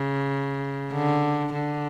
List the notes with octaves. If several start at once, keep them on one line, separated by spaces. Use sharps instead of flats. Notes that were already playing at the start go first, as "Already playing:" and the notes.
Already playing: C#3
D3
D3